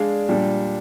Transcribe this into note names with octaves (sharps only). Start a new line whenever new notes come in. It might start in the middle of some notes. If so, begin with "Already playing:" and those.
Already playing: G#3 D4 G#4 D5 F5
A#2 G3 D4